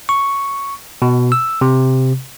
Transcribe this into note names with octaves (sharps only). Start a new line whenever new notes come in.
C#6
B2
E6
C3